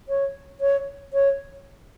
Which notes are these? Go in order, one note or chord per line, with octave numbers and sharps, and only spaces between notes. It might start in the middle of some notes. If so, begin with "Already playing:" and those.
C#5
C#5
C#5